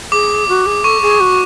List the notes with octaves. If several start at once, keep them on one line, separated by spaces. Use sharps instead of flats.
G#4 D6
F#4
G#4
A4 C#6
G#4
F#4